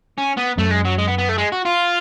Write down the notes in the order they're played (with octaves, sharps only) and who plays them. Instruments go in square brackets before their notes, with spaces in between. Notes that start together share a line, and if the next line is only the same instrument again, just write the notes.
[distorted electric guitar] C#4
B3
[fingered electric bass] F#2 [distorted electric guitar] A3
[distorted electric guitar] G#3
F#3
G#3
B3
B3
A3
G#3
F#4
F4